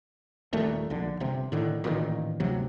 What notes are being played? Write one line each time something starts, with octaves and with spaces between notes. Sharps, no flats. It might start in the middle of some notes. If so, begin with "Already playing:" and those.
D#1 D#2 A#2 A3
A#1 D3
G1 C3
A2 D3 D#3
A1 A#2 D#3
G1 D2 C3 F#3